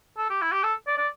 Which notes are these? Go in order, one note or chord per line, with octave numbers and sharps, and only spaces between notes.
A4
G4
E4
G4
A4
D5
D5